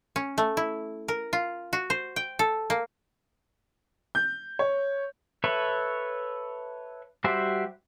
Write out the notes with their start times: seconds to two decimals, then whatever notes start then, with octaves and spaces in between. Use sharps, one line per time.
0.16 C#4
0.38 A3
0.57 E4
1.08 A#4
1.33 F4
1.73 F#4
1.90 C5
2.16 G5
2.39 A4
2.70 A#3
4.15 G6
4.59 C#5
5.44 A4 B4 C#5 E5
7.24 G3 F#4 G4 C5 E5